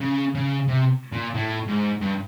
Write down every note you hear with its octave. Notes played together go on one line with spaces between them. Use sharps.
C#3
C#3
C3
A#2
A2
G#2
G2